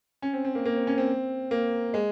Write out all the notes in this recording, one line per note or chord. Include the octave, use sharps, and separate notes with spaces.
C#4
C4
C4
A#3
A#3
C4
C#4
C4
A#3
G#3